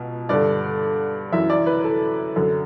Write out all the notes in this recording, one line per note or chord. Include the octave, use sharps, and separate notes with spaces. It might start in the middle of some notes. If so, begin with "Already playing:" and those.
Already playing: C#2 B2
G2 D3 D5
F#2 E3 E5
D5
B4
A4
F#2 D3